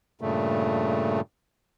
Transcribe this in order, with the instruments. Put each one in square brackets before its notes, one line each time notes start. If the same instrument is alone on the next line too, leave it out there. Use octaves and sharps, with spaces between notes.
[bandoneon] G2 A#2 C#3 A3